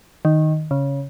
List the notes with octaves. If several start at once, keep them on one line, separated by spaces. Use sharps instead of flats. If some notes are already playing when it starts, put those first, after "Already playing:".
D#3
C#3